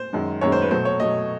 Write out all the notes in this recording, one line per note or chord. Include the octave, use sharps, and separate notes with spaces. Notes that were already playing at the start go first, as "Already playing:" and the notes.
Already playing: C5
F#2 D#3 G#3
F#2 D#3 G#3 C#5
C5
B4
B2 F#3 A3 C5
C#5
B2 F#3 A3 D#5